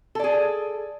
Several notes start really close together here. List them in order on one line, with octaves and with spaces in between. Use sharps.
A4 D5 G#4